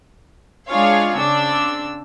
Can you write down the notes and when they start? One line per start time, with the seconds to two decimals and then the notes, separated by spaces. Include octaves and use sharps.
0.69 G#3 D4 F4 G#4 C#5 F5
1.18 C#3 C4 D4 E6